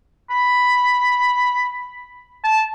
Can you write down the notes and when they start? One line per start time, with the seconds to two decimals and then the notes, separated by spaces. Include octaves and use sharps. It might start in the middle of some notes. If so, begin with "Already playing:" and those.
0.30 B5
2.44 A5